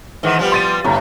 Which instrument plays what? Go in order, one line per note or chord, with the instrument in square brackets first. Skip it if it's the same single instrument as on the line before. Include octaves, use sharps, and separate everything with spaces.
[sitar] G#2 D#3 E3
F3 G3 B3
[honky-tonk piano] C6 A6 D#7
[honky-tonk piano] G1 A#5 [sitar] A2